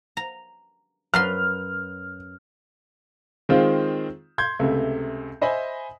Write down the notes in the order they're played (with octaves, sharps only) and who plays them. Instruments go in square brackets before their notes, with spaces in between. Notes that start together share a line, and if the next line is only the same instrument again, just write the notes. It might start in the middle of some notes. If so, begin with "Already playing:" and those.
[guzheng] A#5
[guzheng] F#2 B4 C6 [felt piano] F6
[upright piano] D#3 G#3 C4 F4 C5
C6 G6 G#6
C#2 C3 A3
C5 D#5 E5 G#5 B5